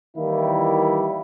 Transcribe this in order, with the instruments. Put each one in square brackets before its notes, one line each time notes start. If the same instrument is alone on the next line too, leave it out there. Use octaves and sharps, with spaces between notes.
[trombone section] D#3 E3 G3 A#3 E4